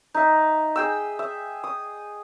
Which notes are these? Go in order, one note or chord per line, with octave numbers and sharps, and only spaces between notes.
D#4 E5
G#4 G5 E6
E5
D#6